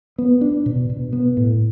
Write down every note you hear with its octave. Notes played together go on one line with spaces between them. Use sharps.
B3
D4
B2
B2
B3
A2